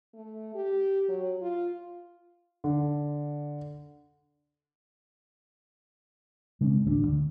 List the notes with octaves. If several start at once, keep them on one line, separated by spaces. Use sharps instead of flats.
A3
G4
F#3
F4
D3
C#3 G#3 C4 C#4
A1 D2 A#3 D4
D3